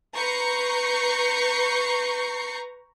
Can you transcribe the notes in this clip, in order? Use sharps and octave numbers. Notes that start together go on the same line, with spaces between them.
B4 A#5 C#6 G6 C7 C#7